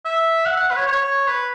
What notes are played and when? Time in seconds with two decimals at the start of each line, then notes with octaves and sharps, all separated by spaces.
0.05 E5
0.46 F#5
0.57 F#5
0.71 B4
0.77 C#5
0.87 C#5
1.27 B4